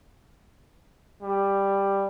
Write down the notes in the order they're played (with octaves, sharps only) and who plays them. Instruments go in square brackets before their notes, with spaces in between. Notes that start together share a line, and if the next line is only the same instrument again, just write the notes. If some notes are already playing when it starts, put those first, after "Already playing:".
[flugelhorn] G3